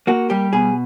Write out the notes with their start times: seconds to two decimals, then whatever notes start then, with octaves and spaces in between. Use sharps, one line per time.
0.07 A#3 F#4
0.30 G3 G4
0.53 B2 G#4